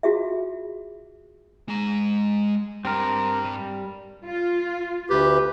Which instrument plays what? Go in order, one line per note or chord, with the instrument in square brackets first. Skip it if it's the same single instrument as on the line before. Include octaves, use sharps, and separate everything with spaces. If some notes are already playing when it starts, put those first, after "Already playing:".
[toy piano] F4 F#4 G#4 E5
[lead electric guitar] G#3 A#5
[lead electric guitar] G2 G4 [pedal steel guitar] C4 A#4
[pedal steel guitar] G3
[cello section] F4
[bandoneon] D2 B4 [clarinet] G4